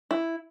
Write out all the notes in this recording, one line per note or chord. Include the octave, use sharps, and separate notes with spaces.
E4